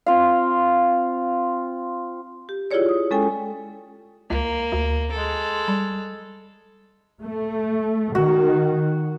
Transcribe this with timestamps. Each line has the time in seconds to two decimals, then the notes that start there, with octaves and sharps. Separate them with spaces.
0.06 C4 F4 F5
2.49 G4
2.71 E4 F4 G4 G#4 C#5 D5
2.89 D#6
3.11 G#3 C#4 A4 G5 G#5
4.30 C#2 A#3
4.72 D2
5.11 G#3 A4
5.68 G3
7.21 A3
8.15 D#3 F#4